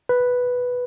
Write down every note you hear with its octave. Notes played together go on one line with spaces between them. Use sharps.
B4